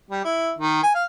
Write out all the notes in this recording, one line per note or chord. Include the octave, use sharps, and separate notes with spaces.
G3
E4
D#3
G#5
F5